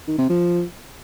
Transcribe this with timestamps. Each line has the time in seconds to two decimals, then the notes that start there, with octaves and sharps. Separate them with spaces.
0.08 D#3
0.18 C3
0.29 F3